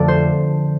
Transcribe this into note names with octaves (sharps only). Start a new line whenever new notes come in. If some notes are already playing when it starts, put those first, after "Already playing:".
Already playing: F2 D3 F3 A3 D5
C5